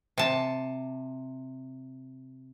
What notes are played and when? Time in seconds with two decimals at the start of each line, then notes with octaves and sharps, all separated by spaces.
0.18 C3 A5